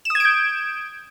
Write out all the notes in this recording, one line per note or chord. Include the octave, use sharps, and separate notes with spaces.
D#6 G6 G#6 D7 E7